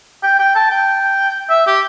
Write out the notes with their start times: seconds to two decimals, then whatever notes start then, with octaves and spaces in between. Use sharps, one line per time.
0.23 G5
0.39 G5
0.55 A5
0.71 G5
1.50 E5
1.67 G4